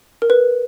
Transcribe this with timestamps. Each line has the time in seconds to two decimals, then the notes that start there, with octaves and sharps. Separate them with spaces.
0.22 A#4
0.30 B4